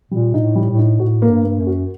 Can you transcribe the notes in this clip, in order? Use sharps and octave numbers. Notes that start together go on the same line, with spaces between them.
A#2 G3
A#2 D#4
A2
G3
A2
D#4
A2 F#4
A#3
G2
A#3
F#2
F#4